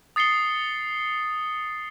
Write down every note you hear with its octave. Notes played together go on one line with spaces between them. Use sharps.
D#6 A6 C7 C#7 G7